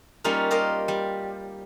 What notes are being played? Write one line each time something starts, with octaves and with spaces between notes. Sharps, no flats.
G3 A#3 C#4 D#4 F4
G4 A#4 C5 D#5
G3